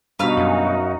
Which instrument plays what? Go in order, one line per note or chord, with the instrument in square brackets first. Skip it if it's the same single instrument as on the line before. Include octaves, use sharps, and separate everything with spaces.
[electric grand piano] G2 B2 [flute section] D#4 F#4 [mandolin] B4 F5 F6
[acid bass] F#2